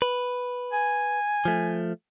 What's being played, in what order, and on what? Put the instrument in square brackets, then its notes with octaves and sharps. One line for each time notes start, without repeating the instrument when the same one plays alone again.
[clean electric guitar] B4
[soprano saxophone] G#5
[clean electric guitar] F3 A3